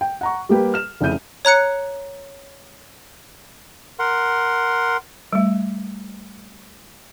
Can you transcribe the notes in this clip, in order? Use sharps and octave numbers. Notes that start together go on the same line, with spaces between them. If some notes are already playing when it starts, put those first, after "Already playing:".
G5
F#5 A#5 C#6
G3 A#3 G4 B4
F6 E7
F1 C#3 E4 G6 D#7
C#5 A#5 F#6 C#7
A#4 F#5 C6
G3 A3